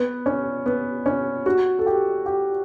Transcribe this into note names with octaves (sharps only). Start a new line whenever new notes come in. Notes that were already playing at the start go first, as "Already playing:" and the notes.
Already playing: B3
C#4
B3
C#4
F#4
A4
G4
G4